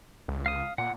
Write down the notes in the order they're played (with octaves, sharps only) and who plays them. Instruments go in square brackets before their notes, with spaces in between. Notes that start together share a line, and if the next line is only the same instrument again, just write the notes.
[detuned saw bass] C#2
[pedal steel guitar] F5 D#6
[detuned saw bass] A#2 [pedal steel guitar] F#5